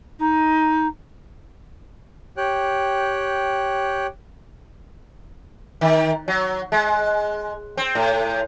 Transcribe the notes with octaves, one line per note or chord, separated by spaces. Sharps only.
D#4
G4 C#5 G5 F#6
D#3
F#3
G#3
C4
A2